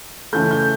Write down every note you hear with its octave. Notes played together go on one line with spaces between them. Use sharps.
C#3 E3 A3 G6
G6